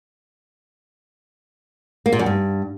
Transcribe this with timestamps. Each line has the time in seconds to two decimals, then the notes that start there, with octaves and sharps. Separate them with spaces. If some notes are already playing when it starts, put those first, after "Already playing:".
2.06 A#3
2.13 A#2
2.19 F#2
2.26 G2